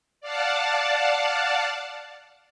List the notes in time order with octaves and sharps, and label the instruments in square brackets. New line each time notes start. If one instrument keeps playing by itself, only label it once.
[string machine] D5 F5 F#5 A5